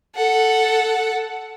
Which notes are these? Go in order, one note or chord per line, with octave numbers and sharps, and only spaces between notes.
A4 F#5